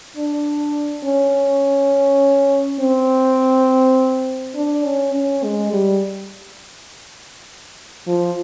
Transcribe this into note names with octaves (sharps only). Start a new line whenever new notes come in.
D4
C#4
C4
D4
C#4
C#4
G#3
G3
F3